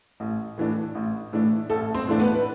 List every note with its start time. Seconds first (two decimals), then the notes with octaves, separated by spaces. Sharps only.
0.20 A1
0.57 A2 E3 A3 D4
0.95 A1
1.33 A2 E3 A3 D4
1.70 A1 A3 A4
1.94 C4 C5
2.07 A2 E3 A3 D4
2.19 B3 B4
2.35 B4